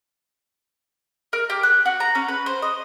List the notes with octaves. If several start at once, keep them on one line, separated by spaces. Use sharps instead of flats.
A#4
G4
F#6
F#4
A#5
C#4
B4
C5
D#5